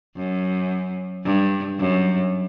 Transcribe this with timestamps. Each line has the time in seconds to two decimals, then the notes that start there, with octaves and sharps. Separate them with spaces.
0.17 F#2
1.25 G2
1.79 F#2